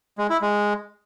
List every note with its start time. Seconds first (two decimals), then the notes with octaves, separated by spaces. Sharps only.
0.18 G#3
0.30 E4
0.42 G#3